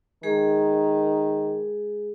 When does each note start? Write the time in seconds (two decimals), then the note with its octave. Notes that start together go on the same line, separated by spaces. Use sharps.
0.23 D#3 G#3 G#4